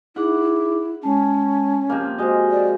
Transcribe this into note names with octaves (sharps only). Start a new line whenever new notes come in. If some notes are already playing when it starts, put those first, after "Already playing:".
D#4 E4 G#4 F#5 D6
G#3 C#4 A5
C3 F3 A#3
G#3 F#4 C5 D#5
D5